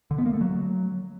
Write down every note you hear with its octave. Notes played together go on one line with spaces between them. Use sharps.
D3
B3
A#3
A3
F#3